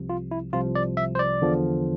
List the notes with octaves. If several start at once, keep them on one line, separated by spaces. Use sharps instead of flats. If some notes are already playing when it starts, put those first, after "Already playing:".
Already playing: C2 C3 F3
F4
E4
C2 C3 F3 F4
D5
E5
C5
D5
E2 D3 F3